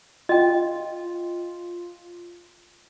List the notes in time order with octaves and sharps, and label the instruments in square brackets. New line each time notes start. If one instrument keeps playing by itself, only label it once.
[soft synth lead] F4 [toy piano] D#5 G5